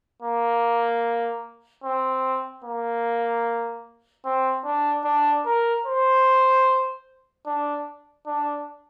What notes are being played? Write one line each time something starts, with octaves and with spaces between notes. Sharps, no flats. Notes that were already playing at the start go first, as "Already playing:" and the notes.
A#3
C4
A#3
C4
D4
D4
A#4
C5
D4
D4